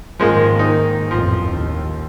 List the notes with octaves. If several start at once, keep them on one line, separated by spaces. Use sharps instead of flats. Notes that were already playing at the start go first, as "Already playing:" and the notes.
G#2 D#3 F3 G#3 A#3
A#3 D#4
A1 F2 F3
D#2